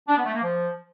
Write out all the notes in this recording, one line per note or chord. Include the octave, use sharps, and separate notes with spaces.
D4
B3
A3
A#3
F3